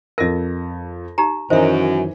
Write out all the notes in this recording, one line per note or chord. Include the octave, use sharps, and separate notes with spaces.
F2 A#4 D#5 A#6
D#4 G4 A#5
F#2 D#3 E3 C5 D#5 E5